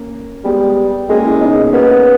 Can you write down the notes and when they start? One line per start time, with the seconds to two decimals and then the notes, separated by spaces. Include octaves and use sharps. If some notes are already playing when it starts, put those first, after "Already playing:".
Already playing: A#3 C#4
0.45 G3 G#3 B3
1.09 G#3 A#3 C#4
1.25 C#4 E4
1.41 B3 D#4
1.73 A#3 B3 C#4